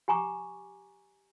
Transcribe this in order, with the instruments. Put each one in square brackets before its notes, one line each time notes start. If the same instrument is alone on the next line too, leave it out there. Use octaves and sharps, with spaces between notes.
[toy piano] G4 G#5 A#5 C#6 D6